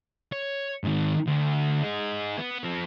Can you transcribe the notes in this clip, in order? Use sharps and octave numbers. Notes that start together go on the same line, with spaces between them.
C#5
G#2 D#3
D2
D#4 G#4
B3
F3 C4